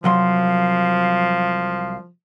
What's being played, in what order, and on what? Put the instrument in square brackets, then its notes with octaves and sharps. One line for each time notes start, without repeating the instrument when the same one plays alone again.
[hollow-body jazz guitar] C2 F#3 C6 [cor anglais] F3 [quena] F5